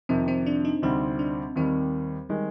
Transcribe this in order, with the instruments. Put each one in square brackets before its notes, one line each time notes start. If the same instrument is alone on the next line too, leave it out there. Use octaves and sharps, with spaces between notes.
[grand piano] F2 C3 D#3 [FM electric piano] C4
[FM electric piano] C4
D4
D#4
[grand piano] D2 C3 G3 C4 [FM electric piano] D#4
[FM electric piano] D4
[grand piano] D#2 D#3 G3 [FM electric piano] C4
[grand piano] D#3 G#3 [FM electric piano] G3